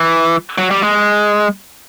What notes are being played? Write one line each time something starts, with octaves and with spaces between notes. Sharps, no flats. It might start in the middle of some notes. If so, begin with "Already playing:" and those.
Already playing: E3
F#3
G3
G#3